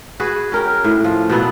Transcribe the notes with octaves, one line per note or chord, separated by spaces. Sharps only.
F#4 G#4 B4
C#4 A#4 G5
A2
F3
B2 F#3 A3 B3